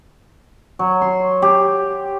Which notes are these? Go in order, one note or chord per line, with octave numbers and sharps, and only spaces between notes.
F#3
C6
G4